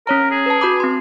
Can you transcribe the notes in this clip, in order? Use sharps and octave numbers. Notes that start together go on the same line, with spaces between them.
C#4 A#4 C#5 A#5
G#4
B4 A5
F#4 B5 D6
C4 C6